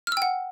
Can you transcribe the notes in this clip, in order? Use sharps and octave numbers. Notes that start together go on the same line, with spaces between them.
F#5 G5 E6 F6